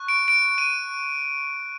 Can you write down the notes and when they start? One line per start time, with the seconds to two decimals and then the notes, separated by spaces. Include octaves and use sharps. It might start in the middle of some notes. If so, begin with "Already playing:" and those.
Already playing: C#6 F#6
0.08 D7
0.28 D7
0.58 D#7